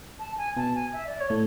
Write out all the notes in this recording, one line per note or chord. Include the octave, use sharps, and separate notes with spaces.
A5
G#5
B2 B3 A5
G#5
E5
D5
C#5
A2 A3